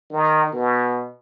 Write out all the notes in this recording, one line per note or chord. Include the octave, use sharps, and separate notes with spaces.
D#3
B2